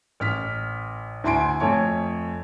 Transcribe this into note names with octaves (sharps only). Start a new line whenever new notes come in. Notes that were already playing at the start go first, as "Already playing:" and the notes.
A1 F6 B6
D2 E4 G#5 C6 D7
F2 A3 C#5 G#5